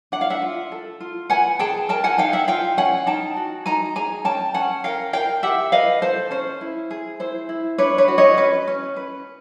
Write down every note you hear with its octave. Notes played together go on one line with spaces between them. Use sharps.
D4 F#5
F5
E5 F#5
F4
A4
F4
B4 F#5 G#5
G#4 G5 A5
A#4 G5 A5
F#5 G#5
D#4 F5 G5
E5 F#5
F4 F5 G5
C#4 F#5 G#5
D#4 G5 A5
F#4
D#4 G#5 A#5
G#4 G#5 A#5
C#4 G5 A5
C#4 F#5 G#5
A#4 F5 G5
A#4 F5 G5
G4 E5 F#5
B4 D#5 F5
A4 C5
C#4 C5
E4
G#4
E4 C5
E4
D4 B4 C#5
B4 C#5
F#4
C#5 D#5
C#4 B4
C#4
B4